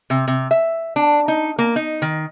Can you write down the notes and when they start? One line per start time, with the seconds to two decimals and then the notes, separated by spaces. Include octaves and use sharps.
0.10 C3
0.28 C3
0.51 E5
0.96 D4
1.28 D#4
1.59 A#3
1.76 D#4
2.02 D#3